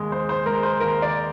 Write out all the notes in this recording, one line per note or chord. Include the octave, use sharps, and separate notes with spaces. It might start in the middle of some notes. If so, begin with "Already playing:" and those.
Already playing: D#2 G#3
G#3 C5
C5
G#3 A#4
C5
D#2 A#4
D5